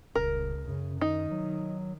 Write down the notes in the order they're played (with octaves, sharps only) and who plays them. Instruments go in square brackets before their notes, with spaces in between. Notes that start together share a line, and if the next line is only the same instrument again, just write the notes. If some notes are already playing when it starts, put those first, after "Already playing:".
[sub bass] D#1 [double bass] C#2 [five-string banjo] A#4
[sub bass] F#2 [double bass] C#3
[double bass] D#3 [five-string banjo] D#4
[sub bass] F#3